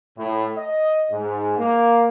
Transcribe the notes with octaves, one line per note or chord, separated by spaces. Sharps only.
A2
D#5
G#2
A#3